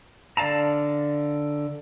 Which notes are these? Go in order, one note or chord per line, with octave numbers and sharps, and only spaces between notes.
D3 D5 F5 A5 A#5